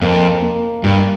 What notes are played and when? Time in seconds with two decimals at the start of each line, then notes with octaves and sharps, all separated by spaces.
0.01 F2 A#3
0.42 A#3
0.83 G2 G3